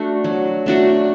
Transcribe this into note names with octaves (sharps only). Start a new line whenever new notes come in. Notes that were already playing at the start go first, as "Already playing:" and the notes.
Already playing: A3 D4 F#4
F#3
A3 D4 F#4